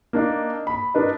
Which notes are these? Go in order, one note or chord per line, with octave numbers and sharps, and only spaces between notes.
A#3 D4 D#4
B5
D4 D#4 A#4 B4 D#5